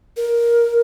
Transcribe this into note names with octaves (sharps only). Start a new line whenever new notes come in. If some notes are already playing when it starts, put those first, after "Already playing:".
A#4